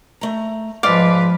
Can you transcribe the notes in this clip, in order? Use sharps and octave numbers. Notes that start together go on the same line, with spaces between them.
A3 A#5
G#2 F3 G#3 B4 D5 F5 D6